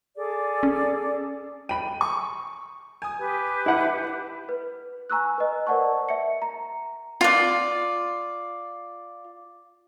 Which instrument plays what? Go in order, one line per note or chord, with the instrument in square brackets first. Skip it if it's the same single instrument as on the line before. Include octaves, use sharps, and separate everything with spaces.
[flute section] G#4 A4 D5
[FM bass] C#4
[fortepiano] G5 B5 [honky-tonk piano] D#7
[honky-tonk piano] C#6
G#5 D#6
[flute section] G4 B4
[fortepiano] E4 F#5
[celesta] B4
G#5 A#5 C#6 E6 F#6
B4 D#5
A#4 C5 D5 F#5 A5 C#6
E5 C#7
A#5
[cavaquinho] F4 D5